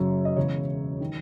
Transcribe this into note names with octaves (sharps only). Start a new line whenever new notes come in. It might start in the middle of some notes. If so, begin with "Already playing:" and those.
Already playing: F#1 F#2 C#3 F#3 C#4 C#5
D#5
E1 E2 C#3 C#5
D#3